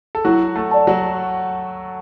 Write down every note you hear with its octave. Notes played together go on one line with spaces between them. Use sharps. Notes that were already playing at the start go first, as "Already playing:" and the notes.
A4
F#3 E4 F#4
A3 A4
D5 A5
F#3 F#4